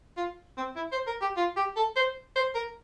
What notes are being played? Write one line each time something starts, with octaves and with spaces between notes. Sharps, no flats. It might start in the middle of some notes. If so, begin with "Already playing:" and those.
F4
C4
E4
C5
A#4
G4
F4
G4
A4
C5
C5
A#4